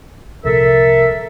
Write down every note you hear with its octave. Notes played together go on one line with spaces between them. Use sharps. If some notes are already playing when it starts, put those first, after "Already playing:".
C2 A#2 F3 A4 A#4 E5